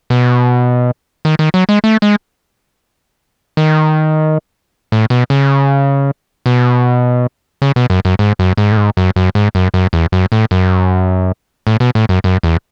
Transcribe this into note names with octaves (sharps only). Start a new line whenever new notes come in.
B2
D#3
D#3
F#3
G#3
A3
G#3
D#3
A2
B2
C#3
B2
C#3
B2
F#2
F#2
G#2
F#2
G#2
A2
G#2
F#2
F#2
G#2
F#2
F#2
E2
F#2
A2
F#2
A2
B2
A2
F#2
F#2
E2